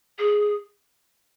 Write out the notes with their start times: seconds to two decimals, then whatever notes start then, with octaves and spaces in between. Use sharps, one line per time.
0.19 G#4